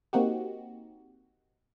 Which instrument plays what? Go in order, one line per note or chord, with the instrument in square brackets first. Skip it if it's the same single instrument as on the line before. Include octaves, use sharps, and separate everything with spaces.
[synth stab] A#3 C4 D#4 F#4 G4